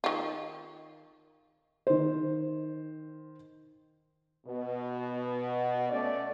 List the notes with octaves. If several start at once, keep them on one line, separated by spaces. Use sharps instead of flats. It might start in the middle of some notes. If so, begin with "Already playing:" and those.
D#3 F4
D#3 C5
B2
A3 C#4 D5